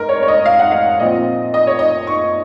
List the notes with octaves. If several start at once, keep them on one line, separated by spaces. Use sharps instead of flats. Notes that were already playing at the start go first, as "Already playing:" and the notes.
Already playing: G#2 A#4
C#5
C#5
D#5
F5
F#5
F5
A#2 F3 C4 D#5
D#5
C#5
D#5
C#6